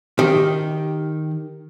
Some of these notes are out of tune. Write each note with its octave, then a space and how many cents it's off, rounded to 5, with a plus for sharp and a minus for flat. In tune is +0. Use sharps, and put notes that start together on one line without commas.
D#3 +0 G4 +0